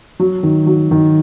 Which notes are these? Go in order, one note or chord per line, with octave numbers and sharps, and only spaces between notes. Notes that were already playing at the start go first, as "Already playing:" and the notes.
F#3
D#3
F#3
D#3